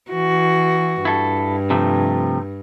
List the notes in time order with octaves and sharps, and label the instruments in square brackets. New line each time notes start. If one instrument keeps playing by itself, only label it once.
[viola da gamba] E3 F#4
[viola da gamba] G2 [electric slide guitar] E4 A4
[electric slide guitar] C3 F3 A3